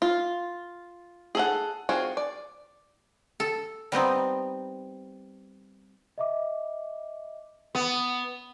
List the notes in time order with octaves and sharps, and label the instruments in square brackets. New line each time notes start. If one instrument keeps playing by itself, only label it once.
[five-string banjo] F4
G#4 A4 F#5
C4 F4 F#4 G#4
D5
[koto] A4
G3 B3 C4 D#4
[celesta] D#5 E5 D6
[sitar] B3